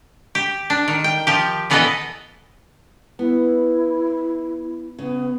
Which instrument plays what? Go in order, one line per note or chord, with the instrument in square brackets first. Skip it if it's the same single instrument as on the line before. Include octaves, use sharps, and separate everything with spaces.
[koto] G4
D4
D#3
G5
F3 G4
A#2 E3 B3 A4 B4 D#5
[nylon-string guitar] B3 [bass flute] E4
[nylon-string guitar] C#3 [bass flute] B3